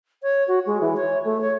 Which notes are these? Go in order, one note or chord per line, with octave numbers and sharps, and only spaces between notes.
C#5
F#4
G#3
E3
C#5
A3
C#5